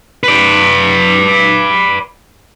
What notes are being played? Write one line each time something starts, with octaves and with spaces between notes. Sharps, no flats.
B4 D5